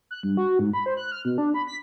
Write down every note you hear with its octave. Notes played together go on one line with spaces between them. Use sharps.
F#6
G2
F#4
G#2
B5
C5
F#6
F6
B2
D4
B5
B6